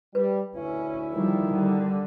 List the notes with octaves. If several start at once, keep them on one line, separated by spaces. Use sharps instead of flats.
G3 B4
D2 C#4 E4
D#3 F3 G3
D3 G3